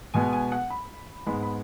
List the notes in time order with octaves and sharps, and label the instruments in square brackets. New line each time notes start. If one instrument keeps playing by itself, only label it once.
[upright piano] B2 G#3 B3 G#5
G#5
F#5
B5
G#2 G#3 B3 B5
B5